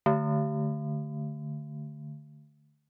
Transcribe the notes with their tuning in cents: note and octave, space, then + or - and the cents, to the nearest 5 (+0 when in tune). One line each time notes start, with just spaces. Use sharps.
D3 +10 A3 +0